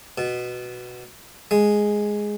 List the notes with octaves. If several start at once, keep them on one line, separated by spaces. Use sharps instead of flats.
B2
G#3